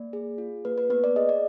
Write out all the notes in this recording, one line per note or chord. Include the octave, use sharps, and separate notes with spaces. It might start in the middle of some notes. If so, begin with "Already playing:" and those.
Already playing: A#3 D5
G#4
F4
A#3 B4
B4
B3 B4
D5
G#4 D#5
D5